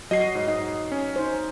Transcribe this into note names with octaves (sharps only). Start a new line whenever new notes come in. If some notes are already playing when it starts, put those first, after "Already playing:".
F#3 F#4 D#5 C7
G#2
D#4 D#5
C#4
D#4 C5